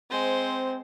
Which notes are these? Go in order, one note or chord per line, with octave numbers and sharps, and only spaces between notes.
G#3 C4 C5